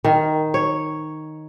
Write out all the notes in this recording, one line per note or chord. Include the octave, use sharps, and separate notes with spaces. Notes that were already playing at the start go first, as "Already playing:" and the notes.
D#3
C#5